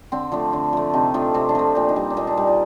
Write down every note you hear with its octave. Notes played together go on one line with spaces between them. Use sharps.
D3 C4
F3 A3 D4
D3
F3 A3
C3 D#4
F3 A3 D4
C3 C4
D4
F3 A3 C4
A#2 D4
D#4
G3
D4
A#2 D#4
D4
G3 D#4
F4